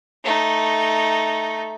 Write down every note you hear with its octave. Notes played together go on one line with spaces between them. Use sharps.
A3 D#4